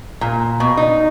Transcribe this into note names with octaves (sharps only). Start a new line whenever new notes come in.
A#2
B2
D#4